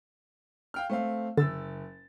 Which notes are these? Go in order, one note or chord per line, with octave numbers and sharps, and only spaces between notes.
F5 G5 F6
A3 C4 F5
F#1 D3 E6 A6